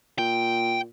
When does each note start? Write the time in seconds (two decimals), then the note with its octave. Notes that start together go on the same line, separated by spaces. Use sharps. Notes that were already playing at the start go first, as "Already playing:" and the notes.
0.18 A#2 G5